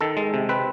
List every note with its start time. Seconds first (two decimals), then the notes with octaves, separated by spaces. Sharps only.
0.01 D#3 A4
0.17 G#3
0.34 C3
0.49 C4 B4